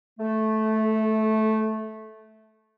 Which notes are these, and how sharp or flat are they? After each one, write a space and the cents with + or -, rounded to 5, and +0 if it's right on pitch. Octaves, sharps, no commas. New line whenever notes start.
A3 -10